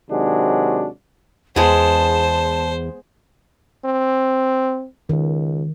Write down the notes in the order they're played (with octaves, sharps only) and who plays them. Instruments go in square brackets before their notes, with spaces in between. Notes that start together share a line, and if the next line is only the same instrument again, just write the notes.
[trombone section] C3 D#3 F#3 G#3 D4 F#4
[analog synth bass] E2 [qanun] G#3 B3 [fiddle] C5 [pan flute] A5
[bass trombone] C4
[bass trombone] C#2 [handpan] D#3